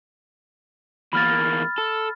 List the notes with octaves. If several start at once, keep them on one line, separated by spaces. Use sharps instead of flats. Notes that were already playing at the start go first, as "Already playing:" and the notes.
E2 A#3 B5 F6 A6
A4